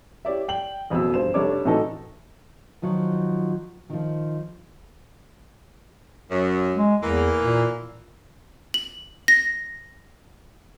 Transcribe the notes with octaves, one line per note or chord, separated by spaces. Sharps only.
E4 G4 C#5 D5 E5
G5 F#7
A1 F2 B2 F#3 E6
G2 C5 E7
F1 G3 D4 C#5 D6
A2 E3 F#3 D#4 A4
D#3 F3 F#3
D#3 F3
F#2
G#3
E2 E3 A#3
A#2
F#7
A#6